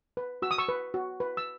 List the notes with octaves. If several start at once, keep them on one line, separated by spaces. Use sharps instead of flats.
B4
F#4 E6
D#6
C#6 E6
B4
F#4
B4
E6